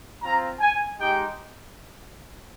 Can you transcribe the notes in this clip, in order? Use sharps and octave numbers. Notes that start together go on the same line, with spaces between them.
C4 F4 A#5
G#5
G#3 D#4 G4 G5